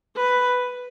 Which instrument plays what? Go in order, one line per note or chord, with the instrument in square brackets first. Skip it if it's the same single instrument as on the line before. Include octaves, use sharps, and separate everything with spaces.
[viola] B4